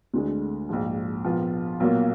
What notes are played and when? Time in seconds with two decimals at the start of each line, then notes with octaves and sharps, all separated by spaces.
0.14 D2 D3 G#3
0.69 A#1 G#2 F3
1.24 A#1 A#2 F3 B3 F4
1.80 B1 A#2 F#3 A#3 F4